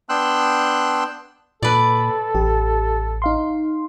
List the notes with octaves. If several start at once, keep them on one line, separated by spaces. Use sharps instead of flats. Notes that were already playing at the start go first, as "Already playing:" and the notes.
B3 D4 G5 C6 E6 F#6
A#2 A4 B4 D5
A1 G4
D#4 F5 C6